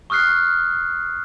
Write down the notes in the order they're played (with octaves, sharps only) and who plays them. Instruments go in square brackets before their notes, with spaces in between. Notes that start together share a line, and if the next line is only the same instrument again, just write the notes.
[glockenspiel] C#6 D#6 F6 F#6 C7